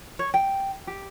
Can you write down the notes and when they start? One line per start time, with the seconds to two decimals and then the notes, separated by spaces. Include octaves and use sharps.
0.19 C#5
0.34 G5
0.87 G4